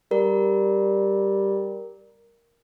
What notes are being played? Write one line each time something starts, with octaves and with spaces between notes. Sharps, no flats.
G3 A#4